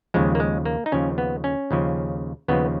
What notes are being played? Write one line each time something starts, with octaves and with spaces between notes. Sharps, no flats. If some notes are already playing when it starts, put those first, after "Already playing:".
D#2 C#3 F3 G#3
A#3
G#3
A#3
D#4
D#2 C#3 F3 C#4
B3
C#4
D#2 C#3 F3
D#2 C#3 F3 B3